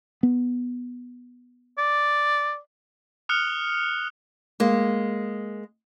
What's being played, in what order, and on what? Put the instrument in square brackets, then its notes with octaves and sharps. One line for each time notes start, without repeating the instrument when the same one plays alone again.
[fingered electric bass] B3
[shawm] D5
[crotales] D#6 F6 F#6 C#7 F7 G7
[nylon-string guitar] G#3 A#3